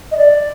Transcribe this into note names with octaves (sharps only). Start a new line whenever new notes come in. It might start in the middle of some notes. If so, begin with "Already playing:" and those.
D#5
D5